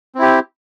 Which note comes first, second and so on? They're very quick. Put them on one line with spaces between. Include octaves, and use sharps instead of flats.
C4 E4 G4